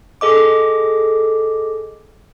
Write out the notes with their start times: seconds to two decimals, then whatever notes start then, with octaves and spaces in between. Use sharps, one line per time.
0.21 G#4 A4 D#5 D6